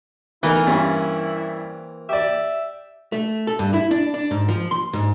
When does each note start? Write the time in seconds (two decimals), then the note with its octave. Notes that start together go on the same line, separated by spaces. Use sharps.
0.43 E3 A3 B3 D#4 E4 A#4 F5
0.67 G2 A#3 C4 C#4
2.09 G4 D5 E5
3.12 A3
3.47 A4
3.59 G2
3.74 E4
3.91 D4
4.14 D4
4.31 G#2
4.49 F3
4.71 C6
4.93 G#2